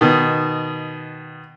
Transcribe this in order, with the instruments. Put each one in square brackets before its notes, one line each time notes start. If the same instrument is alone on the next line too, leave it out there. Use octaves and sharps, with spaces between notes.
[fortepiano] B2 D#3